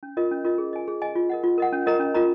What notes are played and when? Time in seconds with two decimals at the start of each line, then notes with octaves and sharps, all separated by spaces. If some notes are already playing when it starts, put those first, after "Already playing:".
0.03 C#4
0.17 F4 A#4 D#5
0.31 C#4
0.44 F4 A#4 D#5
0.58 G#4
0.73 D#5 G#5
0.88 G#4
1.02 D#5 G#5
1.15 F4
1.30 A#4 D#5 F#5
1.44 F4
1.58 A#4 D#5 F#5
1.72 C#4
1.86 F4 A#4 D#5 A#5
2.00 C#4
2.14 F4 A#4 D#5 A#5